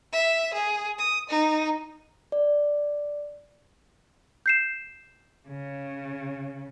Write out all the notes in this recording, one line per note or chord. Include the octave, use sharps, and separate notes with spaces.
E5
G#4
D#6
D#4
D5
G6 C7 E7
C#3